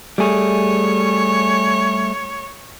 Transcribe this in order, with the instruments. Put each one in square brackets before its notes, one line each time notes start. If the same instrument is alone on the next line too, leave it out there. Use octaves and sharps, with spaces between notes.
[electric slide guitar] G3 A3 G#4 [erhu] C#5